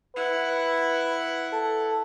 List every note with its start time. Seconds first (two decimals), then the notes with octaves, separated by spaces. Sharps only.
0.16 E4 B4 F#5
1.53 A4